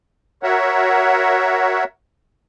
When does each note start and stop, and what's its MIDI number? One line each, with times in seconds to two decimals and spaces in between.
0.43 1.84 66
0.43 1.84 70
0.43 1.84 73
0.43 1.84 76
0.43 1.84 78